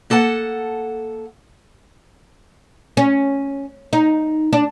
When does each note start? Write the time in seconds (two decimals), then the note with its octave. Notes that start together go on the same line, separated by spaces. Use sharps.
0.10 A#3 A4 F#5 A5
2.97 C#4
3.93 D#4
4.53 D4